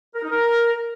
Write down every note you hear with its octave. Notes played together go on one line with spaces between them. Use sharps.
A#4
D#4
A#4